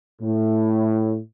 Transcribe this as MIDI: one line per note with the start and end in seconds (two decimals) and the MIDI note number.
0.21 1.17 45